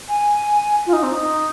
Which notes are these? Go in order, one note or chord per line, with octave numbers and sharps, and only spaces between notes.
G#5
F4
D#4
C4
D#4